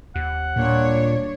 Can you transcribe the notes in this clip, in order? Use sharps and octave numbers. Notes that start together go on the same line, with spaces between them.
D#2 F#5
A#2 G3 D4 C#5